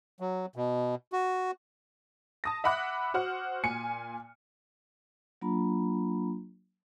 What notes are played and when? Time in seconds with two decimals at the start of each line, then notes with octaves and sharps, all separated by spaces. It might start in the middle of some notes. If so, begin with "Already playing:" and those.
0.20 F#3
0.56 B2
1.13 F#4
2.44 A5 D#6 A#6
2.64 E5 F#5 B5 D6 F#6
3.14 F#4 C5 F#5 F6
3.63 A#2 G#5 C#7
5.42 F#3 A#3 D4 F4 A#5 B5